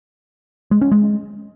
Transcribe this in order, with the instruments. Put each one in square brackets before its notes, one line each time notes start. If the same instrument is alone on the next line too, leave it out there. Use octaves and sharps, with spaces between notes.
[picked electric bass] G#3
C#4
G#3